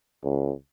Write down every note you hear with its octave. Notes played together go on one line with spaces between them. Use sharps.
C#2